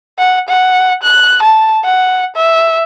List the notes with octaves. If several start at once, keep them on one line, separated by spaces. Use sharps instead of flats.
F#5
F#5
F#6
A5
F#5
E5